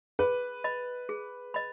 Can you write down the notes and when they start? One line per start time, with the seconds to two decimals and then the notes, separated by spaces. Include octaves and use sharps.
0.19 G#4 B4
0.64 D#5 B5
1.09 G#4
1.54 D#5 B5